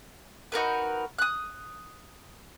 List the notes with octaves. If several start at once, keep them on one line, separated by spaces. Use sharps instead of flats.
D#4 F#4 A#4 B4
D#6 F#6